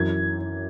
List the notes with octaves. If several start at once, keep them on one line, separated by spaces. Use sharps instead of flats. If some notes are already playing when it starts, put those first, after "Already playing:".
Already playing: F#2 E3 G#6